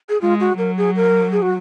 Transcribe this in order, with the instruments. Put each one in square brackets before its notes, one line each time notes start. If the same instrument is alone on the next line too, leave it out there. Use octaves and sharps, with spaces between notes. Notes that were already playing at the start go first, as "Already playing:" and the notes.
[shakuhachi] G#4
[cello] G#3 [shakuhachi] F4
[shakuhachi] F#4
[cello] F#3 [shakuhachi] A#4
[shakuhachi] G#4
A#4
G#4
F#4